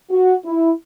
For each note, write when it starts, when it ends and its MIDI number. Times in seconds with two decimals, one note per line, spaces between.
0.10 0.35 66
0.46 0.71 64